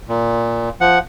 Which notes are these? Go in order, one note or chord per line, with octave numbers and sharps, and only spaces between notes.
A#2
F3 F#5